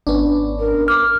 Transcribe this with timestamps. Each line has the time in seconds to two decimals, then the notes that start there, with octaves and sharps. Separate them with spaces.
0.07 G#1 B3 C#4 D4
0.60 A#4
0.88 D6 F6